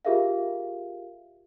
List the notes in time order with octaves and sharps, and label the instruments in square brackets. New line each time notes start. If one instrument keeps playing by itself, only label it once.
[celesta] F4 G4 G#4 A#4 E5 F5